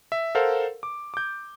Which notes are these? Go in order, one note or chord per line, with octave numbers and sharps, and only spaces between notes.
E5
A4 A#4 C5 F5 F#5
D6
D6 G6